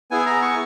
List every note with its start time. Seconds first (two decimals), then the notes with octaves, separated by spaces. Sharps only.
0.11 B3 E4 G#4 G#5
0.26 A#5
0.42 C#6